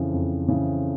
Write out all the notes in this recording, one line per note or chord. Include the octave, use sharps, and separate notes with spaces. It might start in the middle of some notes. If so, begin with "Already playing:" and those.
Already playing: F2 C#3 E3
F2
C#3 E3